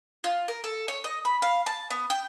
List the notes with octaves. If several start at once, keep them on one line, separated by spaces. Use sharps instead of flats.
F4
A#4
A4
C#5
D#5
B5
F5
A5
B3
G5